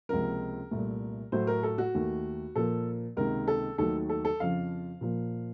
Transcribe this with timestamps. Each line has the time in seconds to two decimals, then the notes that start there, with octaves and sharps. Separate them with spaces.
0.09 C#2 C3 F3 A#3 A#4
0.71 C2 A#2 A3
1.32 A2 F#3 A3 C5
1.47 A#4
1.63 A4
1.78 F#4
1.94 D#2 D#3 A3
2.56 A#2 F3 A#3 A4
3.17 C#2 C3 D#3 A#3 A#4
3.48 A4
3.78 D#2 D#3 F#3 A3 A4
4.09 A4
4.25 A4
4.40 F2 C#3 F3 F5
5.01 A#2 F3 A#3